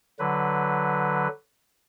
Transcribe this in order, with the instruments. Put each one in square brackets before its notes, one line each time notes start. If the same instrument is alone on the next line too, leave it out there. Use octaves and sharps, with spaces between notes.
[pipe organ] D3 F#3 B4